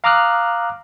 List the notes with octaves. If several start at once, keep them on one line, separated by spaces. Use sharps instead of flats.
F5 A#5 D6 D#6 F6 F#6